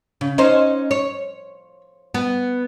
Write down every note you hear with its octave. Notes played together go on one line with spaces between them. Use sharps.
C#3
C#4 D#4 C5
C#5
B3